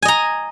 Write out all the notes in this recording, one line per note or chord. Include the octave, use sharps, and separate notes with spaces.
D#5 G#5 A#5